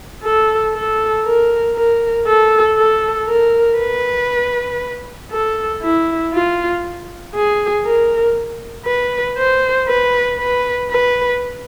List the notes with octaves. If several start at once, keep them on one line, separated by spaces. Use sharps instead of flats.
A4
A4
A#4
A#4
A4
A4
A#4
B4
A4
E4
F4
G#4
A#4
B4
C5
B4
B4
B4